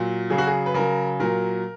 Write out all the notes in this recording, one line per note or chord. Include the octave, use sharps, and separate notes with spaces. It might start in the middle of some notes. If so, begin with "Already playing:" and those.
Already playing: A#2 F#3
C#3 F#3 G#4
F#4
G#4
B4
C#3 F#3 A#4
A#2 F#3 A#4